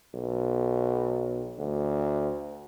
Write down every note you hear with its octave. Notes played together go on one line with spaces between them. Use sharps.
B1
D2